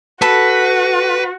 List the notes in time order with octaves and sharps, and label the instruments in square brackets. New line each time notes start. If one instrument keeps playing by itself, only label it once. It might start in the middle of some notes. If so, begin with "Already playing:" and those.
[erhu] F#4 [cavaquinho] A4 [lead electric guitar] B4